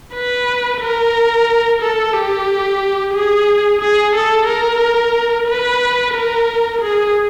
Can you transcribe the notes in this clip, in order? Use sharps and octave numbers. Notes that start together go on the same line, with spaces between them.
B4
A#4
A4
G4
G#4
G#4
A4
A#4
B4
A#4
G#4